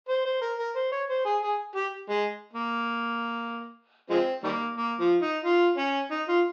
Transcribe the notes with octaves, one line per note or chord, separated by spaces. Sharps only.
C5
C5
A#4
A#4
C5
C#5
C5
G#4
G#4
G4
G#3
A#3
F3 G#3 C4
D#3 G3 A#3
A#3
F3
D#4
F4
C#4
D#4
F4